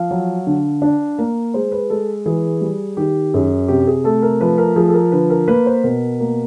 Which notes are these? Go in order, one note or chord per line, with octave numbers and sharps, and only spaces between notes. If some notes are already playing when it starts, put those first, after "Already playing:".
Already playing: F3 F5
F#3
D3
D4
A#3
G#3 C5
B4
G#3 A4
E3 G#4
G3
D#3 G4
F#2 G#4
C3 G4
G#4
A3 A4
A#4
F3 B4
A#4
F3 G#4
A4
A#4
D3 B4
A#4
A#3 B4
C5
B2 A#4
A#3